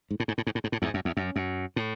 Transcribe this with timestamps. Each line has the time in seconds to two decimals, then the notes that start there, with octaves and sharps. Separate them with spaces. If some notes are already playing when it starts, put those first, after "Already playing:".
0.11 G#2
0.20 A2
0.28 G#2
0.38 A2
0.47 G#2
0.55 A2
0.64 G#2
0.72 A2
0.82 E2 G#2
0.94 F#2
1.05 E2
1.17 F#2
1.36 F#2
1.76 A2